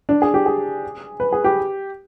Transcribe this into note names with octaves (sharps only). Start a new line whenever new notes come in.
D4
G#4
G4
G#4
B4
G#4
G4